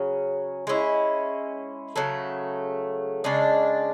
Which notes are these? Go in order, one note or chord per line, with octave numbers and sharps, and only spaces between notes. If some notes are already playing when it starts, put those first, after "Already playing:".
Already playing: C#3 F#3 C#4
G#3 C#4 E4
C#3 F#3 A3
C#3 G#3 D4